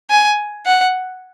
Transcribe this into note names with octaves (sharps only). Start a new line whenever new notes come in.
G#5
F#5